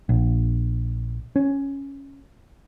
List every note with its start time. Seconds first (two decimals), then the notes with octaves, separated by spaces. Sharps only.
0.09 A#1
1.36 C#4